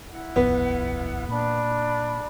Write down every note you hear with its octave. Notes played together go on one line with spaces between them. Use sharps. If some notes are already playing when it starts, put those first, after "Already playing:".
E4 F#5
D#1 B1 F2 B3
A#2 D4 B5